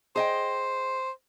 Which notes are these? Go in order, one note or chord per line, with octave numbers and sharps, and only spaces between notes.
G#4 C5 D#5 G5